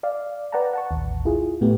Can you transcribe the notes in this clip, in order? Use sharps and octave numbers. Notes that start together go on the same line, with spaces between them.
D5 F5
B4 D5 F#5 G5 A5 A#5
F#5 A5 C#6
A1 D#2
E4 F4 G#4
A2 A3 B3 G4